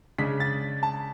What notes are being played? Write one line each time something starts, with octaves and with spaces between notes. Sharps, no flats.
C#3 G#3 D4 B6
A6
A5